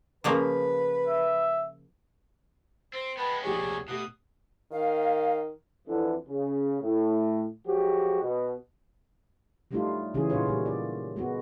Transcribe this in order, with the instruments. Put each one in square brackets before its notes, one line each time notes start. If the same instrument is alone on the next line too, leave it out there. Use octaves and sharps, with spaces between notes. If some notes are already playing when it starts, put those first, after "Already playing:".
[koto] C#3 F3 A#3 [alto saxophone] B4
[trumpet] E5
[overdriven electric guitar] C4 [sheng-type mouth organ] C5
[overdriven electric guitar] G#3 B3 [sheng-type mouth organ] B4 G5 A5
[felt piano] A#1 G4 G5 [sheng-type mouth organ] G#4 C#5
[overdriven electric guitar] D2 C3
[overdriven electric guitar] B2 [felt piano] A3 G4 F#6 [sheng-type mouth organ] D#6
[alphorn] D#3 [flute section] F5
[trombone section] F2 D3 E3
C#3
A2
F3 F#3 G#3 F#4 G4
B2
[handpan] F#3 G3 A3 D4 D#4 F4
C#3 E3 F#3 C#4 G#4
A#2 D3 C#4 D#4 F4 C#5
A#2 G3
D5
G#3 B3 F#4